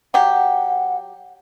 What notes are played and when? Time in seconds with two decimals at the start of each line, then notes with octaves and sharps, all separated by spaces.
0.14 F#3 G4 F#5